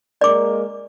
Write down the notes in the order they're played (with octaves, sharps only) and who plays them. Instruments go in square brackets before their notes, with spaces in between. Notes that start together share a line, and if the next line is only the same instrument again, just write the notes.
[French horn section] G#3 A#3 A#4 [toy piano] D5 D6